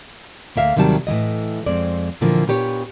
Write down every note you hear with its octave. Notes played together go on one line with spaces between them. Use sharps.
D2 A#3 E5 F5
D#2 C3 D#3 F#3 G3 A5
A2 E3 F#3 D#5
F2 G#3 C4 D5
A#2 D3 E3 F3 A#3
A#2 B3 D4 G4 B4 C#5